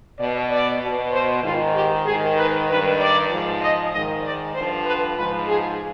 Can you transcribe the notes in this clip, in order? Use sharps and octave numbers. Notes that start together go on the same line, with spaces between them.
B2 D5
D5
B2
C5
G#2 D#3 F4
G4
G#2 D#3 G#4
B4
G2 D#3 B4
D5
G#2 F3
D#5
G#2 D#3 D#5
D5
G2 D3 F3 C5
B4
G#2 F3 B4
G#4